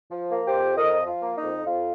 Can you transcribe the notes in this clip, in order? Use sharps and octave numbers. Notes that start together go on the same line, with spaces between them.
F3
A#3
G4 C5
F2
F2 A#4 D#5
F3
F4
A#3
D#4
F2
F2 F4